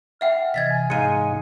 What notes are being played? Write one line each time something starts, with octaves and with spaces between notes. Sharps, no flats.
E5 F#5 G5 F6
C3 E3 D#5 G#6 A6 B6
G#5
G#2 G#3 D#4 F5 C#7 D#7